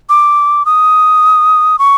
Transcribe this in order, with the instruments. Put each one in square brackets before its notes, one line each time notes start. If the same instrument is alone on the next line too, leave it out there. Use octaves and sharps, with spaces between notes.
[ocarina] D6
D#6
C#6